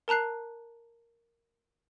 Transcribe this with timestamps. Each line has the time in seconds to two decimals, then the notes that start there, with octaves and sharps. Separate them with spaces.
0.08 A#4 A5 A#5 F#6 C7